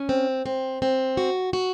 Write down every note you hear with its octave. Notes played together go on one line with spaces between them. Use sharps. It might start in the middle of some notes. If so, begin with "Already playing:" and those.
Already playing: C#4
C4
C4
C4
F#4
F#4